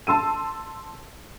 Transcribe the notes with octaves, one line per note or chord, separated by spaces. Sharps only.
A5 C6 E6 D#7